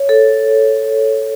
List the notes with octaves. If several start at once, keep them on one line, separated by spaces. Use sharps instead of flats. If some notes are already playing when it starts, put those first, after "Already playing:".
Already playing: C#5
A4